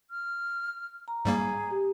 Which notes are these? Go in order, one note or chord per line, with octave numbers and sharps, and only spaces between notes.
F6
A#5
G#2 G3 A#3 G#4
G4